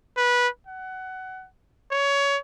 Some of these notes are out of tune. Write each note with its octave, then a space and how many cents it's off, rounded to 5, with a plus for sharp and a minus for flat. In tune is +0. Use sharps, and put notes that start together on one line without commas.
B4 -15
F#5 +20
C#5 +20